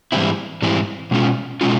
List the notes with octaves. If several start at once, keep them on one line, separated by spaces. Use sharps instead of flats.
G#2 E3 G3 C4 E4
G#2 E3 G3 C4 E4
B2 G#3 C#4 F4
B2 G#3 C#4 F4